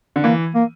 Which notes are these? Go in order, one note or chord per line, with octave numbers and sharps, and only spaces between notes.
D3
E3 A#3
A#3